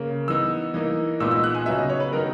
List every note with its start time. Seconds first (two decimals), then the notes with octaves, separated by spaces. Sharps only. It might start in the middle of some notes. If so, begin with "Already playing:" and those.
Already playing: C#3 A#3
0.28 E3 B3 D#4 E6
0.74 E3 A#3 D#4
1.20 A#2 G#3 B3 D#4 E6
1.31 E6
1.44 F#6
1.54 G#5
1.66 C#3 F#3 B3 D#4 E5
1.78 D#5
1.90 C#5
2.00 B4
2.12 D#3 F#3 B3 D#4 A#4